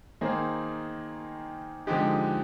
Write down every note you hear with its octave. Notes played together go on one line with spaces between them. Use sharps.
D#3 A#3 D#4 G#4 C5
D3 F3 G#3 D#4 G4